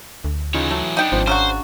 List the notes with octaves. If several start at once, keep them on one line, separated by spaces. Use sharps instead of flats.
D2
C#3 E3 D#4 F4 C#5
F#3 A3
B3 D4 D#4 G5
G#1 F3 C4 C5
C#3 F#3 D4 F#4 C5